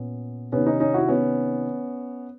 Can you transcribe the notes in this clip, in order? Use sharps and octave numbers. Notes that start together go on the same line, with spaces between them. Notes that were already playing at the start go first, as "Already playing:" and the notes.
Already playing: A#2 B3 C#4
C3 D#3 B3 C#4
C#4 D#4
C#4 D#4
E4 F#4
B3 C#4